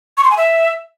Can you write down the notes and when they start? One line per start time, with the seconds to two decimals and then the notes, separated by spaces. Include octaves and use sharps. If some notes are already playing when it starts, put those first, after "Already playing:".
0.17 C#6
0.24 C6
0.31 G#5
0.37 E5